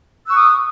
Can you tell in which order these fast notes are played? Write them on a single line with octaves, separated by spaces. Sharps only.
E6 F#6 C#6 D#6